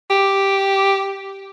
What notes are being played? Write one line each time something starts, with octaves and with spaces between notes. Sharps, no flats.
G4